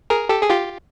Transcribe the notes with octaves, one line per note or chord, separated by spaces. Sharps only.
G#4 A#4
G4 A4
G#4
F4 G4